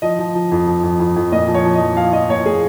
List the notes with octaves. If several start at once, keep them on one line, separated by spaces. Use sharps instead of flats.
F3 D#5
F3
F3
F2
F3
F2
F2
F2
A#2 D#5
F3
C#5
F3
D#5
F3
F3 F5
F3 D#5
A#2 C#5
A#2 G#4